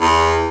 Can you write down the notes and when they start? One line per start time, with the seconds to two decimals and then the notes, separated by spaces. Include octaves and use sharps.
0.01 E2